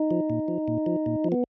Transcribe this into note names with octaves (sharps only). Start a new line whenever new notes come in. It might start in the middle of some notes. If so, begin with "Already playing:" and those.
Already playing: D#4
F3
A#2
F3
A#2
F3
A#2
F3
B3